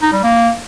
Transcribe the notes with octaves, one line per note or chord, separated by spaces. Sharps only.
D#4
G3
A#3